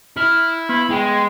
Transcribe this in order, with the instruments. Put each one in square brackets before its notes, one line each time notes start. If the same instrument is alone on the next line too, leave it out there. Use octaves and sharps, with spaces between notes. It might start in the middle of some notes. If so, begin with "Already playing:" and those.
[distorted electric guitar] E4 [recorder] F6
[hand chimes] B3 [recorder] B5
[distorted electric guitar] G#3 [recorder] G5